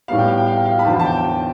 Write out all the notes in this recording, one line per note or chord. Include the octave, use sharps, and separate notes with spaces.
A2 G3 B3 F5
G5
F5
G5
F5
G5
F5
B5
E2 D3 F3 A5
A5
G5
G5